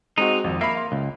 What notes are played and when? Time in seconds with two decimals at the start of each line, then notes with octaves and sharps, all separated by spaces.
0.18 G#3 C4 D#4 F#4
0.44 G#1 F2
0.61 A#3 E5 B5
0.76 F5 C6
0.92 C#2